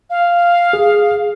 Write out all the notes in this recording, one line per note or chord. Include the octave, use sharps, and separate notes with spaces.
F5
G#4